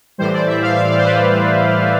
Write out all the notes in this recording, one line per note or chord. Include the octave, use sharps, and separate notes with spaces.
A2 E3 G3 C5
D5
E5
F5
F5
D5
C5
B4